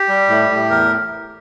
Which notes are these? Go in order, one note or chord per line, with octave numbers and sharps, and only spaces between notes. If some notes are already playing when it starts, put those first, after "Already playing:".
Already playing: G4
G3
A2
A2
E2 A#4